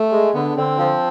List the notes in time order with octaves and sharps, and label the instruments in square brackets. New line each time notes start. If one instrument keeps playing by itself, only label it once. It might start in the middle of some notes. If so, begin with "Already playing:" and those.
Already playing: [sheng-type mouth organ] A3
[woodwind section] G#3
[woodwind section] D3 [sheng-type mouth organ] B3
[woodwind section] D3 [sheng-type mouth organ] C4
[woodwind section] F3